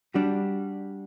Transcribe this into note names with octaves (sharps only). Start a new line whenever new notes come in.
G3 D4 F#4